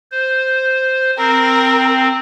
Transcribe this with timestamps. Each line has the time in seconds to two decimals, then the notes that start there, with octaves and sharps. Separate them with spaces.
0.11 C5
1.18 C4 A#4